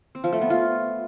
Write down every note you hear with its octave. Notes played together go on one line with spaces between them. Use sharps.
C4
F3
A3
B3
F4